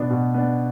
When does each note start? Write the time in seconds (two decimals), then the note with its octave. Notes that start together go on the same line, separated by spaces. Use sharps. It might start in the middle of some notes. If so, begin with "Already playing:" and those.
Already playing: B2 B3 D4
0.10 B2
0.34 B3 D4